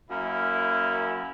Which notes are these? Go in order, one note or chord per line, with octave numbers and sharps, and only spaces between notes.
F#2 A#3 E4